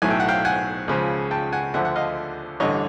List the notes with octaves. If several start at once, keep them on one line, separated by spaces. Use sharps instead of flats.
B1 A2 F#3 A3 G#5
G5
F#5
F5 G5
F#5 G#5
C#2 C#3 F3
G5 A5
F#5 G#5
D2 D3 F3 E5 F#5
F#5
D#5 F5
A1 G2 D3 C#5 D#5